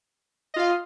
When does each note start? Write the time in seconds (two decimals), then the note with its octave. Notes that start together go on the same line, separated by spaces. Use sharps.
0.54 D#5
0.56 F4
0.59 F5